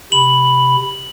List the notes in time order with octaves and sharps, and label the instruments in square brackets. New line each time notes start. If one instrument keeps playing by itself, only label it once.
[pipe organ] C3 B5 [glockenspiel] F#7